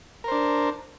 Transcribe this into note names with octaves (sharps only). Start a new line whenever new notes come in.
D4 A#4 C5